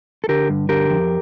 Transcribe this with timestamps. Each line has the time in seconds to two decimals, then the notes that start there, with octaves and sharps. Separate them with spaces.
0.24 A4
0.29 D3 G4 A#4
0.49 G2
0.69 D3 G4 A#4
0.90 F2